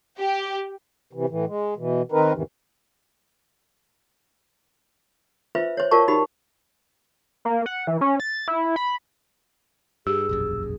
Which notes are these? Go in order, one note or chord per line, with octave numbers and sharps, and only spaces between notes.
G4
C3 E3
A2 E3
G#3
B2 E3
D#3 C4 D#4 A#4 B4
E2 G#2 C3 D#3 E3
F4 B4 C5 E5
C5 C#5
F4 F#4 A#4 D5 A5 C#6
D#4 F#4 G4 B5
A#3
F#5
E3
C#4
A6
E4
B5
G2 G4 G#4 E6
E1 A#1 F#2